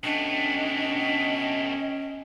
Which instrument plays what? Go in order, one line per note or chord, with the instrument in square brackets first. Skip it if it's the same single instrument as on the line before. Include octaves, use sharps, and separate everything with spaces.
[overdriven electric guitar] B2 A3 [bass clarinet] C#4 [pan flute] D4 [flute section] D#5 G5